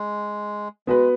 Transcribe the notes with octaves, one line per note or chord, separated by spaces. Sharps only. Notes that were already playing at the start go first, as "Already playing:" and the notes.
Already playing: G#3
G#3 B3 F#4 B4